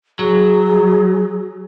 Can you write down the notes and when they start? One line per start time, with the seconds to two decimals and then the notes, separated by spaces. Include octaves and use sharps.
0.19 F#3 G#4